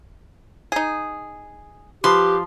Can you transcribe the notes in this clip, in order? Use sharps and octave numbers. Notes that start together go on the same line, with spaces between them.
D#4 G#4
F3 G4 B4 C6